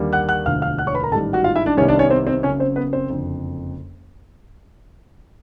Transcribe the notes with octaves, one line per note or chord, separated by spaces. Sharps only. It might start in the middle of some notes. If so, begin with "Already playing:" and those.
Already playing: D#2 D3 G3 A#3
F#5 F#6
F#5 F#6
E1 D2 D3 F3 F5 F6
F5 F6
F#5 F#6
C#5 C#6
B4 B5
A#4 A#5
A1 G#2 D#3 G3 A4 A5
F#4 F#5
F4 F5
E4 E5
D4 D5
C2 C3 D#3 G3 B3 C#4 C#5
D4 D5
C#4 C#5
C4 C5
C4 C5
F#1 F#2 C#3 C#4 C#5
C4 C5
B3 B4
C4 C5
F#1 F2 D3